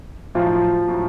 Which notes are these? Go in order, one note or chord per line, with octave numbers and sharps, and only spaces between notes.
A2 F3 F#3 F4
A2 F#3